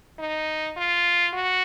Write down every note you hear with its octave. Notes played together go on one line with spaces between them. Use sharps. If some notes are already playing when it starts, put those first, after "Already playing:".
D#4
F4
F#4